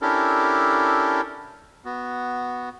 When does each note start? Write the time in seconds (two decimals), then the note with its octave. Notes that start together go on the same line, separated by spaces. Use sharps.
0.02 C#4 D4 E4 G4 A4 A#4
1.85 B3 F#4